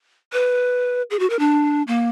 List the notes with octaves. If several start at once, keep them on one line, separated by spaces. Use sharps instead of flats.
B4
G#4
F#4
A#4
D4
A#3